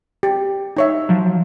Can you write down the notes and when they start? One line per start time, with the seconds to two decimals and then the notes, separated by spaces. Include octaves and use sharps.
0.23 G4
0.77 D#4 C#5 E5
1.09 F3 F#3